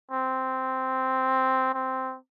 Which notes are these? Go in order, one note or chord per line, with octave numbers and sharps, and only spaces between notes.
C4
C4